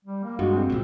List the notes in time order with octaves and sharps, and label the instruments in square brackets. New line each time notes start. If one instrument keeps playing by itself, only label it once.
[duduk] G3
A#3
[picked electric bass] G2 [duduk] G#3 [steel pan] F#4
[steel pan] G#3 [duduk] C4
[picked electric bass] C#2 A#2